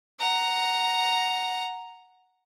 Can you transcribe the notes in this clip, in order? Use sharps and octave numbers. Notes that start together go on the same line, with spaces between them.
F#5 A#5